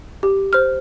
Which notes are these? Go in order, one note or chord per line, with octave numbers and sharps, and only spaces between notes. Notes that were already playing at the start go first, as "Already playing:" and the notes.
G4
C5 F6